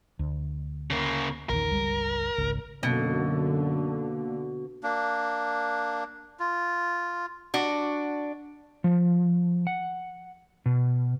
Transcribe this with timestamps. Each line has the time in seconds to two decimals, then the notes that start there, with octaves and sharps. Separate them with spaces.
0.19 D2
0.90 C#3 A#3
1.49 A#1 E2 D#3 A#4
1.71 G1 C#2 G3
2.38 G#1 C#2
2.83 F#2 B2 D3 A#3
4.83 A#3 D4
6.40 F4
7.54 D4 F#4
8.84 F3
9.67 F#5
10.66 B2